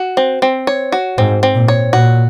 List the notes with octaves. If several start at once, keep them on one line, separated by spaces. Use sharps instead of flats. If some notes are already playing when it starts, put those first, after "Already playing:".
Already playing: F#4
C4
C4
C#5
F#4
G#2 C4
C4
A#2
C#5
A#2 F#4